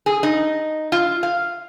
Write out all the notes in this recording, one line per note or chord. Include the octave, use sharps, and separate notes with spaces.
G#4
D#4
F4
F5